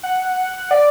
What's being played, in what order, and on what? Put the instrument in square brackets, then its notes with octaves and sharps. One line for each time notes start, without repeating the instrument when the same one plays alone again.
[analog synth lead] F#5
D5